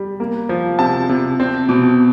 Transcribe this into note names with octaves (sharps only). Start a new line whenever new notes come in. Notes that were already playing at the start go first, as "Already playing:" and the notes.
Already playing: G3
A#3
F3
C3 A5
C3
C4
B2